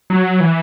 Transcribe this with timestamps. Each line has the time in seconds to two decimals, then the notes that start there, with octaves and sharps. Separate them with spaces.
0.10 F#3
0.40 E3